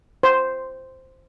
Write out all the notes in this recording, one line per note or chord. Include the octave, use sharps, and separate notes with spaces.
C5